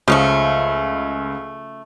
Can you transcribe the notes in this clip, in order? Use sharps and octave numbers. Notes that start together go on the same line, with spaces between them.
C#2 C#3 F3 A3